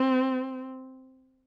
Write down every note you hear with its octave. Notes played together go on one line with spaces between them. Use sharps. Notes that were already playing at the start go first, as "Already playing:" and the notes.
Already playing: C4